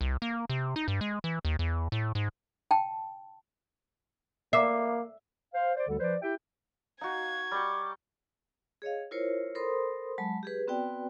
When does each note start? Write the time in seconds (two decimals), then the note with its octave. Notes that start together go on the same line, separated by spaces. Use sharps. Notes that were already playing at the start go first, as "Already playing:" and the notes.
0.01 C2
0.22 A#3
0.50 C3
0.76 D#4
0.88 G2
1.01 G#3
1.24 E3
1.45 D#2
1.59 E2
1.92 A2
2.15 G#2
2.71 G5 A5
4.53 A#3 E5 D6 C7
5.54 C5 F5
5.76 C5 D5
5.88 D2 D3 G3 A4
6.00 F3 B4 C5 D5
6.22 E4 G4 E5 G5
7.01 D#4 F#4 F5 G#6
7.51 G3 G5 C#6 D6
8.82 G#4 C#5 D#5 F5
9.11 E4 F4 A#4 C5 C#5
9.55 A4 A#4 C5 B5 C6 D#6
10.18 F#3 G#3 A5 B5
10.43 G4 G#4 B4
10.67 B3 C4 F#4 B4 D5 G5